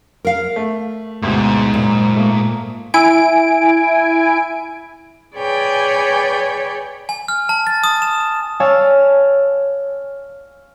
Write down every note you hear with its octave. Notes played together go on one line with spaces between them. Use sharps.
A#4 F5
A3
A1 D2 G#2 B2
F#1 A#2
A3 A#3
E4 G#5 D7
G#4 B4 C#5 D5 G5 G#5
G#5
F6
A5
A6
D#6
E7
C#5 D5 F5 G#5 A5 E6